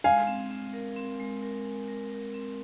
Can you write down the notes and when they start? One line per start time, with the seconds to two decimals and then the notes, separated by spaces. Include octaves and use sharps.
0.04 G#3 F5 G#5
0.27 C4
0.51 C4
0.73 A#4
0.96 C4
1.20 G#3
1.42 A#4
1.66 A#4
1.88 A#4
2.12 A#4
2.34 C4